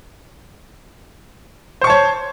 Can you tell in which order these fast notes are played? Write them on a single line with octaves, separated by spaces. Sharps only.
C5 C#6 A5 C#5